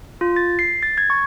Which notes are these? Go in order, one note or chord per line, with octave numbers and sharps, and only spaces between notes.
F4
A6
C7
A6
G#6
C#6